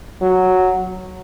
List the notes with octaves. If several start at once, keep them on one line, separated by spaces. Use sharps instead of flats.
F#3